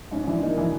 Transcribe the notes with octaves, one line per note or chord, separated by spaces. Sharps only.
G#2 C#4
E3 D4
A#3 D#4
E3